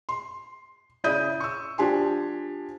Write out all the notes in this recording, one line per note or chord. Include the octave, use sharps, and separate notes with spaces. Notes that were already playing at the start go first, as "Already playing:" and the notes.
C6
C#3 E4 D5 D#6 G6 D#7
C#6 E6
F3 D4 G4 G#5 C6